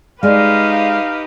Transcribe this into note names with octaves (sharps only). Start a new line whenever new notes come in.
G#3 D#4 G4 B4 D5 F5